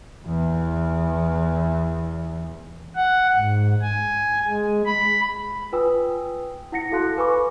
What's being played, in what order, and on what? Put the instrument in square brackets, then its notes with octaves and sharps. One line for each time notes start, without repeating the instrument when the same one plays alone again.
[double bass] E2 E3
[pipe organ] F#5
G#2
G#5
G#3
B5
[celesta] F4 B4 G5 G#5 D#6 E6
E4 F#5 A#6 C#7
F#4 A4 F5 A5 C6 F#6
A4 B4 G#5 B5 C#6 D6